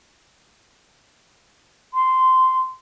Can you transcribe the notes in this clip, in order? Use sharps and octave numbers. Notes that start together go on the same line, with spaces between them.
C6